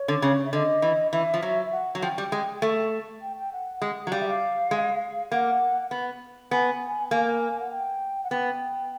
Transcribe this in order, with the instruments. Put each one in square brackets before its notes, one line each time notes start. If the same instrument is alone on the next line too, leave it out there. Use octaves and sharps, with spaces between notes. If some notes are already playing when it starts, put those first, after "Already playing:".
Already playing: [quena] C#5
[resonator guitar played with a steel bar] D3
C#3
[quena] E5
[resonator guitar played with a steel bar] D3 [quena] D#5
[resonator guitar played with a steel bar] E3
[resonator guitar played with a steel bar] E3 [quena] E5
[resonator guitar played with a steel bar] F3
F#3
[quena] F#5
[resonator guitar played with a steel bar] F#3
[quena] F#5
[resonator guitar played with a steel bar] F3 [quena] G5
[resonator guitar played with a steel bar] G3
G#3
A3
[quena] G5
G5
F#5
[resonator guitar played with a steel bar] G#3
F#3
[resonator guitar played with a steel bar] G3 [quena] F5
[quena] E5
F5
[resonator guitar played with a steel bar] G#3
[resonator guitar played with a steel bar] A#3 [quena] F#5
[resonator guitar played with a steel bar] B3
[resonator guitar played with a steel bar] B3 [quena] G#5
[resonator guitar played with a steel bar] A#3 [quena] G#5
[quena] F#5
G5
F#5
[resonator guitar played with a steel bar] B3 [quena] G5